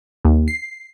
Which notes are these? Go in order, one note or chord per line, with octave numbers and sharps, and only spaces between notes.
D#2
C7